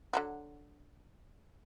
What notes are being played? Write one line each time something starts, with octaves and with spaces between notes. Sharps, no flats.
D3 F#3 F#4